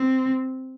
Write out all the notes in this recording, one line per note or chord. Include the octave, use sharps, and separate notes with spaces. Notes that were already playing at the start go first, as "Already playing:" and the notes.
Already playing: C4